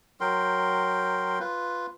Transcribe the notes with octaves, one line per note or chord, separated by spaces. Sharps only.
F#3 A#4 G5 C6
F4 B4